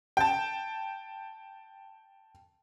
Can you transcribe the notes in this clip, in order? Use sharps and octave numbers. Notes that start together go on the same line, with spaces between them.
G5 A5